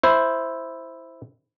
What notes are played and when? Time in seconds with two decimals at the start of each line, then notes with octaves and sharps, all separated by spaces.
0.03 E4 C5